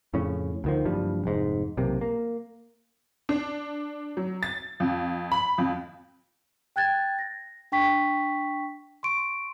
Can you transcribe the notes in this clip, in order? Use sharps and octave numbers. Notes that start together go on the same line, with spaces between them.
F2 A2 C#3 C#4
D2 D#3 F3
F#1 G2 F3 G3
F1 G#2
E1 B1 C3 A#3
A#3
D4
F#3
A6
F2
B5
F2
G5 F#6 G#6 A6
A#6
D4 G5 C#6 B6
C6 C#6 D7